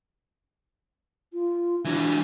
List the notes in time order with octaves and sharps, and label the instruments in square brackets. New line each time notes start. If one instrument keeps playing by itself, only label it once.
[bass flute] F4
[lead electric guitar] E3 F#3 [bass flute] D4